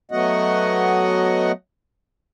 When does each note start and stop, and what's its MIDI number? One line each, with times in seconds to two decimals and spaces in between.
0.11 1.52 54
0.11 1.52 57
0.11 1.52 59
0.11 1.52 66
0.11 1.52 75
0.11 1.52 78